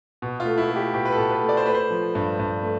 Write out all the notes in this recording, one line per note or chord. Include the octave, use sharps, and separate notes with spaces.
B2
F4
A3
E4
A3
G4
B2 G4
B4
A4
B2
B4
A3
D5
C5
A3 B4
C5
F3
G2
G2
A3